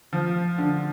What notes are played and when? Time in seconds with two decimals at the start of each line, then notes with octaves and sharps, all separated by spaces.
0.13 F3
0.58 D3